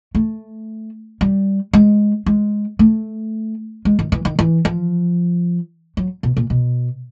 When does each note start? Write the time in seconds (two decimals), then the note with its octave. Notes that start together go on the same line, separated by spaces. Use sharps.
0.15 A3
1.21 G3
1.73 G#3
2.26 G#3
2.79 A3
3.85 G#3
3.99 D#3
4.12 E3
4.25 D#3
4.39 E3
4.65 F3
5.97 F#3
6.23 B2
6.37 A#2
6.50 B2